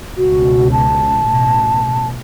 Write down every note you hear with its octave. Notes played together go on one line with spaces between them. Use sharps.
C#2 B2 F#4
A5
A1 B2